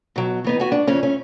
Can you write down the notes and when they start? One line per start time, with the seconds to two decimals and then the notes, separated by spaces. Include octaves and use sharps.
0.16 B2 F#3
0.44 E3 B3 D#4
0.60 B3 F#4 G#5
0.72 D4
0.87 F2 C#3 C#4
1.03 A3 C#4